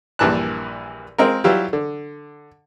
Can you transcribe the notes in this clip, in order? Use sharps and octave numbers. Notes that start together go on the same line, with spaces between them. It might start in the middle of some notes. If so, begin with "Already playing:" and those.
A#1 G2 A#2 E3 A5 F#6
G#3 C4 F4 A#4
F#3 G3 E4 F4 G4
D3